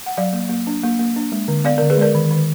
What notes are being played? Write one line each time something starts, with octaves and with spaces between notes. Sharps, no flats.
F#5
F#3 D5 F5
A#3
A#3
D4
A#3
A#3
D4
G#3
D3
B3 D5 F5
D3 A#4 D5
G#4 B4
G#3 A#4 D5
D#3
D#3